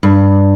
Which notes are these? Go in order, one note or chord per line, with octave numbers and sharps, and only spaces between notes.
G2